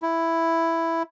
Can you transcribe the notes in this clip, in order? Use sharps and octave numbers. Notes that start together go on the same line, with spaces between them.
E4